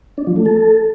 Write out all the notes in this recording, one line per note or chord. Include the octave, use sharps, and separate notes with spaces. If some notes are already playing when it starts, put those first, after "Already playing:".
D4
F3
A3
A4